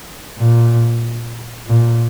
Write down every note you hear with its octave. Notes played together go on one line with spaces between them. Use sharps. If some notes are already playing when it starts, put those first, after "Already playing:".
A#2
A#2